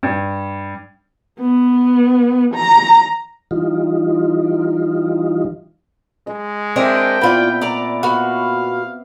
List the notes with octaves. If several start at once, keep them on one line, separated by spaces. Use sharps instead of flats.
G2
B3
A#5
E3 G3 D#4 F4
G#3 D#5
C4 D4 A#4 D#5 E5 G5
A#2 B3 E4 F4 D5
D5 A#5 D6
B3 F#4 F5